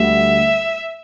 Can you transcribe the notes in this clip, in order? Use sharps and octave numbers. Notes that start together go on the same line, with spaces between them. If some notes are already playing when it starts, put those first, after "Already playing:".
Already playing: D2 D3 G3 E5